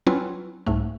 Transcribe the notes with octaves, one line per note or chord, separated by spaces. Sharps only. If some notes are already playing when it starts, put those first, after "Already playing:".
F#3 C4 C#4 E4 F4 B4
C2 G#2 A3